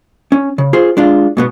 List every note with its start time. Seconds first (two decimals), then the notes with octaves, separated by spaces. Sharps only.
0.32 C#4
0.58 C#3
0.73 F4 G#4 C5
0.97 G#3 D4 F4
1.37 G#2 B2 B3